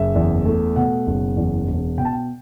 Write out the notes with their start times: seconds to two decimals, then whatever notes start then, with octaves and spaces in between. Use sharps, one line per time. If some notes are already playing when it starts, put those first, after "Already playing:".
Already playing: F#1 E5
0.15 E2
0.45 A3
0.76 B2 F#5
1.07 F#1
1.37 E2
1.67 E1
1.98 B2 G5
2.05 A5
2.13 G5